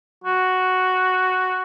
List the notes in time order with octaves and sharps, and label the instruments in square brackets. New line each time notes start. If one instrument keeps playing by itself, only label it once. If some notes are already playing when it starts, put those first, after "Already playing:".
[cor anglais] F#4